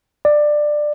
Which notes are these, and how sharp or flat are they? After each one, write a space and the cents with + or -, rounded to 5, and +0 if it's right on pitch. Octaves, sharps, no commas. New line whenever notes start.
D5 +15